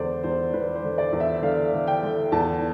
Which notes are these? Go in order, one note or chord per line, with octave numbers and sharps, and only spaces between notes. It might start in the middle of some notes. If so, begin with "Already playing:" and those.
Already playing: E2 D3 C5 D5
E2 C5
E2 B4
C5
D3
D5
E2
E5
D3 F5
D3
G5
D3
E2 A5